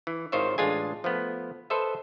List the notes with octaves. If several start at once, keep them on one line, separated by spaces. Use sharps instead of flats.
E3
G#1 D#3 F4 C5 C#5 E5
A1 G#3 D4 F4 G#4 G#5
F3 A3 B3
A4 B4 C5 D#5 E5